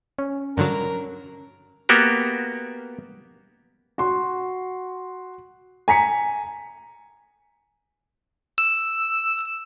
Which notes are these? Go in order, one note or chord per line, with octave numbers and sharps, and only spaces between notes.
C#4
G2 D3 F#3 A#4
A#3 B3 F#4 G4
F#4 F#5 C6
G#5 A#5 B6 C#7
E6